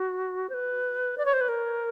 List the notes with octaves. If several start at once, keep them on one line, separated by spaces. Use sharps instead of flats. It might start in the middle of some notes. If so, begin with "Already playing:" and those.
Already playing: F#4
C5
B4
D5
C#5
C5
B4
A#4